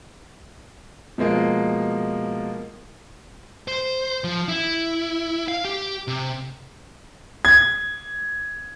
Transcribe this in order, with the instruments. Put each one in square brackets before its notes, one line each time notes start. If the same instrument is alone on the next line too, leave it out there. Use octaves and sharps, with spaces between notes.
[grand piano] B2 F3 G#3 A#3
[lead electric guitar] C5
F3
E4
F5
G4
C3
[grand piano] G#6